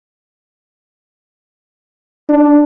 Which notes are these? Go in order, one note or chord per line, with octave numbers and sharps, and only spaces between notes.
D4